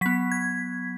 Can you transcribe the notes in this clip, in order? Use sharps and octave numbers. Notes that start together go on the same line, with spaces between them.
F#3 B3 B6
G#6